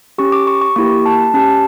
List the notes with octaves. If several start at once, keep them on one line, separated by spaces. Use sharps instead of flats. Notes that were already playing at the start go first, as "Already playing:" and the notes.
C#4 G4 C#6
D6
C#6
C#6
A#3 E4 G4 C#6
A5
C#4 G4 A5